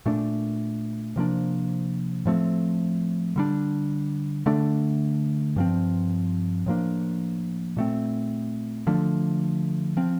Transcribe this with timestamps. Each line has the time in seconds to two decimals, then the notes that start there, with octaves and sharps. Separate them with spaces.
0.06 A#2 A3 D4
1.16 C3 F3 A#3 D4
2.25 A2 F3 A3 C4
3.36 D3 G3 A#3 D4
4.46 D3 A3 D4
5.56 G2 F3 C4
6.66 A2 F3 A#3 D4
7.77 A#2 A3 C4
8.87 D3 F3 A3 D4
9.97 F3 C4